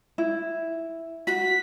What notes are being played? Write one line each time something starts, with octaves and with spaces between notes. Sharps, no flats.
E4
F#4 B6